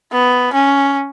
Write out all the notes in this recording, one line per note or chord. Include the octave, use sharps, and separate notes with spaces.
B3
C#4